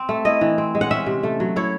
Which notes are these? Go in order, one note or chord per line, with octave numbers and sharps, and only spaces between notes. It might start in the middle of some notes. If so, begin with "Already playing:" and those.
Already playing: C4
A3
E4 D#5
E3
C4
G#3
F#5
C#4 E5
C3
A3
F#3
E4 C#5